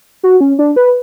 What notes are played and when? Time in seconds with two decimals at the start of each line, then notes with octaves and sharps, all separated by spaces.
0.23 F#4
0.41 C#4
0.59 D4
0.76 B4